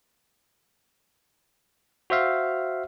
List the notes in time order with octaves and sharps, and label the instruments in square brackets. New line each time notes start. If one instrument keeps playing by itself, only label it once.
[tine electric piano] F#4 C5 E5 F5